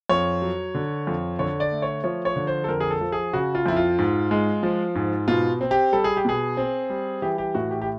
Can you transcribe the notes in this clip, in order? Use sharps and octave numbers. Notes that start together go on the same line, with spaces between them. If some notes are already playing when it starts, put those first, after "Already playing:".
F2 C#5
F#3
D3
F2
D3 C#5
D5
A3
C#5
F3 C#5
C#5
D3
C5
A4
F2 A#4
G#4
A4
F3
G#4
C#3 F#4
F4
F2 E4
F4
G#2
G#3
F3
G#2
B2 F4
C4
G4
G3 A4
G#4
G4
B2 G#4
C4
G3
E3 G4
G4
A2 F#4
G4
G4